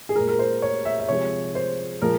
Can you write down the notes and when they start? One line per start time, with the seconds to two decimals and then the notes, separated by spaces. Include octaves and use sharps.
0.09 G#4
0.15 G#3 A#4
0.20 A#2
0.28 A#4
0.39 C5
0.62 C#5
0.85 E5
0.99 E5
1.08 C3 F3 G#3 C#5
1.55 C5
2.02 A#2 F3 G#3 A#4